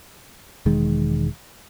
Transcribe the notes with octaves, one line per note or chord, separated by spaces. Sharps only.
E1 D#3 G#3